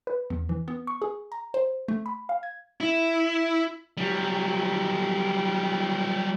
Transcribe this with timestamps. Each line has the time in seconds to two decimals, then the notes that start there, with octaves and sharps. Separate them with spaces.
0.07 B4
0.30 E2
0.49 E3
0.68 B3
0.87 C#6
1.02 G#4
1.32 A#5
1.54 C5
1.88 A3
2.06 B5
2.29 F5
2.43 G#6
2.81 E4
3.97 F#3 G3